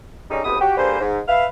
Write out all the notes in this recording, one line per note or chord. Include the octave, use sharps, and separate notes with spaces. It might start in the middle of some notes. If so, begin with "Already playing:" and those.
D3 G3 G#3 C#4 D#4
C#2 A2 C3 B3 B5 D#6
F#4 G4
D3 A#3 G4 G#4 B4 C5
G#2
B4 E5 F5